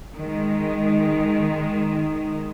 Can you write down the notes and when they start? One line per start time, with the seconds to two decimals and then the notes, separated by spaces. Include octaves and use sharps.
0.16 D#3 G#3